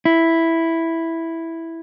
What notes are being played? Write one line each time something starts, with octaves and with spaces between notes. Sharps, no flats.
E4